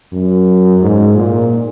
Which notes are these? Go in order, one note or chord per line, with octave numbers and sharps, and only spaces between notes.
F#2
G#2
A#2